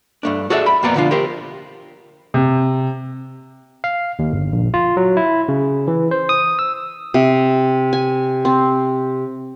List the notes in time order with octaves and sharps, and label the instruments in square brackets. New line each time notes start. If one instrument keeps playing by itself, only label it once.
[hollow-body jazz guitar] G2 A3 D4
F#4 G#4 A4 D5 E5
B5
F2 A#2 B3 D5 A#5
D3 F3 D4 F4
G4 A#4 C5
[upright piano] C3
[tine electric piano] F5
D#2
G1
A#1
F4
F#3
E4
C#3
E3
C5
D#6
E6
[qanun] C3
G#5
C4